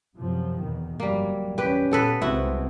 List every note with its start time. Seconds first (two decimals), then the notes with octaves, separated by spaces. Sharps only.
0.15 F#2 C3 F3
0.60 E2 B2 D#3
1.00 G1 F2 F#3 G3 A#3
1.58 E2 C#4 G4 B4
1.91 A#2 B3 A4 B4
2.22 C2 G#3 C4 E4 F#4